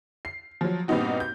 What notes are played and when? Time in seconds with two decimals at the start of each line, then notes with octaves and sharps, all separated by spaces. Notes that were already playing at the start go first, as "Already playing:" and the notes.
0.25 C7
0.61 F3 F#3
0.88 G2 A#2 B3 C4 D#4 F#4
1.20 G6